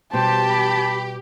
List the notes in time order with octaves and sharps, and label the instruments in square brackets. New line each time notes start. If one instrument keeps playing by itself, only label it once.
[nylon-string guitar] B2 G3 [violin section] G4 [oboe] C5 [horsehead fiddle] A5
[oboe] B5